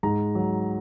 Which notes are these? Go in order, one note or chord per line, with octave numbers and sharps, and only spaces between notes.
G#2 A#5
F#3